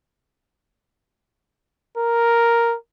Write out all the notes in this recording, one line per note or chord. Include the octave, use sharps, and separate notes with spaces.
A#4